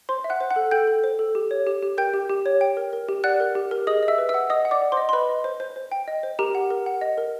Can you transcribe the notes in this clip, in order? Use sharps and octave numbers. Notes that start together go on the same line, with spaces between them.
C5 C6
E5
F#5 F#6
C5
F#5 F#6
A4
A4 G5 G6
A4
C5
A4
G4
C#5
G4
G4
A#4 G5 G6
G4
G4
C#5
G5
A#4
A#4
G4
D5 F#5 F#6
A#4
G4
A#4
G#4 D#5 D#6
D#5
E5 E6
B4
E5 E6
F#5
D#5 F#5 D#6
F#5
D5 D6
F#5
C5 C6
D#5
C6
B4 D#5 B5
D#5
C5
C5
C5
G5
D#5
C5
G4 A#4 A#5
F#5
A#4
F#5
D#5
A#4